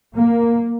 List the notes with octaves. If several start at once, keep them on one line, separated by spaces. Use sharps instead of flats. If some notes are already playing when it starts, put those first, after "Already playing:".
A#3